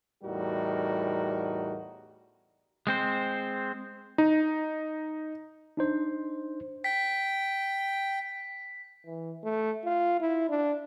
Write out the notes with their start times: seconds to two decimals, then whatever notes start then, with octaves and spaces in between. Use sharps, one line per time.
0.24 E2 A2 G3 D#4 F#4 A#4
2.87 G#3 C4 C5
4.18 D#4
5.77 D4 D#4 C5
6.84 G5 B6
9.06 E3
9.44 A3
9.85 F4
10.21 E4
10.49 D4